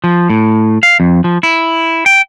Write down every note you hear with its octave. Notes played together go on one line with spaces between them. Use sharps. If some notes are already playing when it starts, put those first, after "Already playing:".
F3
A2
F5
F2
F3
E4
G5